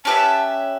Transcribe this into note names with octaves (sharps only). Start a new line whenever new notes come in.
C#4 G4 B4 E5 A5